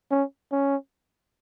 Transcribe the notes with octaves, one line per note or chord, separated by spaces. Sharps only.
C#4
C#4